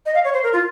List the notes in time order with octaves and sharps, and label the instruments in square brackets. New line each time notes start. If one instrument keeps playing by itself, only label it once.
[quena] D#5
F5
C#5
C5
A#4
F4